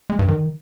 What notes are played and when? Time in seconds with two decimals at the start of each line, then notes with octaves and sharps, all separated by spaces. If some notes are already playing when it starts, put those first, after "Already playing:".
0.10 G#3
0.19 G2
0.28 D#3